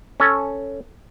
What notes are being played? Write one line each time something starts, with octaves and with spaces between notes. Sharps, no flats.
C#4 A4